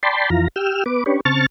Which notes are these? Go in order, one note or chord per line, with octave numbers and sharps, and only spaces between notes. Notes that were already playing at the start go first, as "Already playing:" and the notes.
D5 G5 A5 B5 C6
F2 E3 F4 A#5
G4 G5 E6 F6
B3 B4 D6
C#4 D4 G4 B4 C#5
C#3 C4 A5 C#6 F6 A6